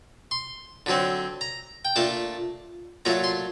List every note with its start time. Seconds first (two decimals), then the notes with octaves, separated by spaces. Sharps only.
0.31 C6
0.86 D3 F#3 C4
1.41 A#5
1.85 G5
1.96 A#2 A3 D4 A5
3.05 A#2 F#3 A3 A#5
3.24 C6